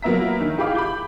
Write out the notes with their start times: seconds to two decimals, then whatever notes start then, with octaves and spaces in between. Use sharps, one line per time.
0.02 F#3 A#3 B3 E5 A#5 B6
0.41 D#3
0.58 E4 G4 G#4 F5 B5 D6
0.75 B5 D6 G6